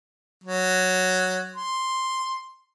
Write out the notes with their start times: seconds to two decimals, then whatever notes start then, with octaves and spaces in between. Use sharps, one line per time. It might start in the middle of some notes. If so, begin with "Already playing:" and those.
0.44 F#3
1.55 C6